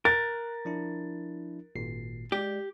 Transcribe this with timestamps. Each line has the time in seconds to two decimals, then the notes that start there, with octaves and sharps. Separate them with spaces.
0.05 A#4 F#6 A6
0.65 F3 D4 E4
1.75 G#1 A#2 C7
2.32 G#3 G4 D5